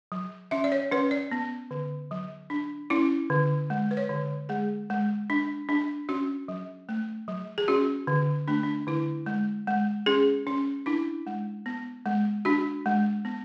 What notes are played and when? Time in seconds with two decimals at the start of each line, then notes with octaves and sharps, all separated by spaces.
0.12 F#3
0.51 C#4 E5
0.64 D5
0.72 C#5
0.92 C#4 B4
1.11 D5
1.32 B3
1.71 D3
2.11 F#3
2.50 D4
2.90 C#4 E4
3.30 D3
3.70 G#3
3.91 B4
3.97 C#5
4.09 D3
4.49 G#3 G#4
4.90 G#3
5.30 D4
5.69 D4
6.09 C#4 F#4
6.48 F#3
6.89 A3
7.28 F#3
7.58 G#4
7.68 C#4 F#4
8.07 D3
8.48 A3 D4
8.63 D4
8.87 D3 E4
9.26 G#3
9.67 G#3
10.06 C#4 G#4
10.47 C#4
10.86 D4 E4
11.27 G#3
11.66 B3
12.06 G#3
12.45 D4 F#4
12.86 G#3
13.25 B3